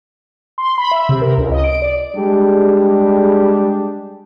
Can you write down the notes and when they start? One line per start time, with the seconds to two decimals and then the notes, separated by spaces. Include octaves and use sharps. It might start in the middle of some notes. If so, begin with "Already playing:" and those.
0.58 C6
0.78 B5
0.91 E5
1.09 C3
1.21 A#4
1.37 C#2
1.52 D#5
1.64 D7
1.82 D5
2.16 G3 G#3 D4 G4 G#4